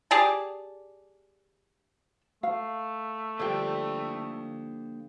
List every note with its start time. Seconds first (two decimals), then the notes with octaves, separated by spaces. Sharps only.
0.11 G4 G#4 D5 A5
2.43 A3 F5
3.39 D3 F3 G3 A#3 G5